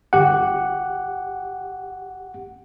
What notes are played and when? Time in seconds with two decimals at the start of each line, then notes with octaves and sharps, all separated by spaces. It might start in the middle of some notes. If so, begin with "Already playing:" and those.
0.13 G1 G4 F#5